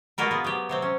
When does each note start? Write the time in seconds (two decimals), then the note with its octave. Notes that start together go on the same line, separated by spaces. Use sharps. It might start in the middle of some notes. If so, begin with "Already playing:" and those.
0.18 G#3 A#3 F4 F#4 A#4 B4
0.31 B3 G#4
0.44 F#3 G4
0.69 C3 F#3 C4
0.82 C#4